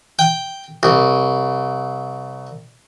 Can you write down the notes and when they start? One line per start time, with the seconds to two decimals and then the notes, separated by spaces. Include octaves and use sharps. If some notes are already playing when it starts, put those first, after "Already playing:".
0.19 G5
0.83 C2